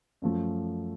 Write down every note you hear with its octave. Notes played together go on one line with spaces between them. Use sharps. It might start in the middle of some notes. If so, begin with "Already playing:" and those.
F#2 F3 A3